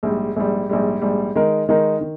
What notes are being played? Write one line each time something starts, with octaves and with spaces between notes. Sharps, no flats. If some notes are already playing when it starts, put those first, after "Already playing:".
A#1 G#2 G3
A#1 G#2 G3
A#1 G#2 G3
A#1 G#2 G3
D#3 G#3 D#4 A#4
D#3 G#3 D#4 A#4
D#3